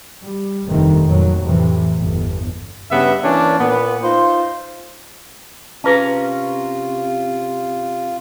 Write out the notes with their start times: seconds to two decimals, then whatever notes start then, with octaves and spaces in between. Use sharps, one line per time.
0.23 G3
0.67 F1 G2 C3 D#3 A3
1.05 F2 A#2 F#3
1.42 F2 A2 C3 E3
1.99 G1 E2
2.91 G2 C#3 B3 E5
3.23 E3 A#3 C#4 D4
3.58 A#2 B3
4.03 D#4 F4 C5
5.84 C3 C#4 F4 G#4 A#4 B4 A5